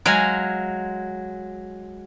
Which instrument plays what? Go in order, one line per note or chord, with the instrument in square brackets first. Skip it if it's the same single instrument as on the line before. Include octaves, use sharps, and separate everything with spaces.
[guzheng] F#3 G#3 F5 G#5